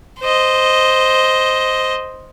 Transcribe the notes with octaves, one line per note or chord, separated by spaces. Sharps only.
C5 D#5